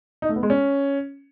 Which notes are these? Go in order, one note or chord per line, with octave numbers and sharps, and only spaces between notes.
D#4
A3
B3
G#3
C#4